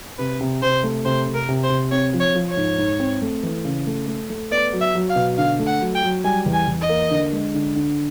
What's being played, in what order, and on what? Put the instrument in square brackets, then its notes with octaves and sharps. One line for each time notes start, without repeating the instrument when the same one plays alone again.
[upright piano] C3 [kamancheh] B4
[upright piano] C3
[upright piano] C3 [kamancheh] C5
[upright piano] A3
[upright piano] C3 [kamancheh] C5
[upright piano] C3
[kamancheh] A#4
[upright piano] C3
[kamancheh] C5
[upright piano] C3
[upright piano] C4 [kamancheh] C#5
[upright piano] F3
[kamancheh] C#5
[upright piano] F3
[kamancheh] C#5
[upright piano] G#2
G#2
C4
A3
E3
C#3
A3
A3
A3
[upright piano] B3 [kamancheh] D5
[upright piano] F#3
[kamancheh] E5
[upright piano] F#3
[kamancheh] F5
[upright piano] B2
[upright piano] D3 [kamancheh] F5
[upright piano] A3
[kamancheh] F#5
[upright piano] F#3
[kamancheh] G5
[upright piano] F#3
[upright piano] G3 [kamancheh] G#5
[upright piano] E2
[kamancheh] G#5
[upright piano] E2
[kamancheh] D#5
[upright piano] A#3
D3
G#3
D3
D3